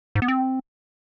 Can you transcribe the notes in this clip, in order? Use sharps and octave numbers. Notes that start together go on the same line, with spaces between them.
G#2
B3
C4